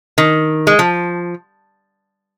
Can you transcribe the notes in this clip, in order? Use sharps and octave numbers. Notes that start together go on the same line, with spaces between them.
D#3
G#3
F3